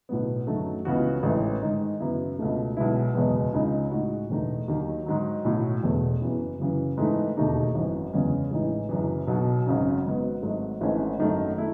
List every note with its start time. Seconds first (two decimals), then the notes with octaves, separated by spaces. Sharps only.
0.09 B1 A2 F#3 B3
0.47 F#2 D#3 F#3 A3
0.85 C#2 C#3 E3 B3 F#4
1.23 A1 G#2 E3 A3
1.62 G#2 D#3 G#3
2.00 F#2 C#3 F#3 B3 E4
2.39 C#2 B2 A3
2.77 B1 B2 G#3 B3 E4
3.14 F#1 E2 B2 G#3 B3
3.53 C#2 C#3 G#3 D#4
3.91 A2 G#3 D#4 F#4
4.30 E1 E2 D#3 A3 D#4
4.68 D#2 D#3 F#3
5.06 G#2 D#3 F#3
5.45 B1 A2 F#3
5.83 E1 E2 B2 A3
6.22 F#1 F#2 C#3 E3 B3
6.59 F#1 F#2 C#3 E3
6.97 G#2 E3 A3 D#4
7.37 E1 D#2 D#3 A3 D#4
7.74 G#1 F#2 E3
8.13 F#1 E2 C#3 G#3 C#4
8.51 A1 A2 E3 G#3 D#4
8.89 F#1 F#2 E3
9.28 B1 B2 F#3
9.66 G#1 F#2 C#3 F#3 C#4
10.05 G#1 G#2 F#3 B3 F#4
10.42 G#1 G#2 F#3 A3
10.81 G#1 G#2 E3 A3 C#4
11.19 G#1 F#2 D#3 A3
11.58 A3 E4